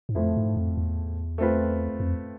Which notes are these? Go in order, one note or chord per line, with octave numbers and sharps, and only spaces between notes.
G#2
F2 A2 F3 A3 E4
G#2
F2
E2
A3 C4 F4 B4
F2